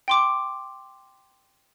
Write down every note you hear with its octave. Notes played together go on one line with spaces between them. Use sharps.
G5 C6 D6